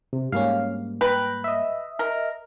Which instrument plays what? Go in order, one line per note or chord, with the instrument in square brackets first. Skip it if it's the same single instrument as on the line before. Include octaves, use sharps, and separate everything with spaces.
[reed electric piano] C3
[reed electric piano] G#2 G3 A#3 [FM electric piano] C#4 F5
[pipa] B4 [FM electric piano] G5 A#5
[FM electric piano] D#5 E5
[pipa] A#4